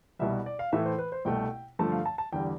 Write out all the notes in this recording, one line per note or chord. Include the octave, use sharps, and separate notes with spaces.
C2 B2 G3 E5
D5
F5
A2 E3 A3 E5
C5
B4
C5
C2 B2 A3 G5
G2 D3 F3 A3 A5
F5
A5
A5
E2 D3 G3 G5